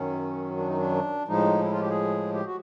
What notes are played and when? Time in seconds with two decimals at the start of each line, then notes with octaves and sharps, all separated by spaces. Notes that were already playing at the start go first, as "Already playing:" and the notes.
Already playing: F#2 D#3 F#3 C#4
0.57 D4
0.67 D#4
0.77 D4
1.28 A2 F3 G#3 D#4
1.63 E4
1.73 F4
1.81 G4
1.90 G#4
2.34 G4
2.46 F#4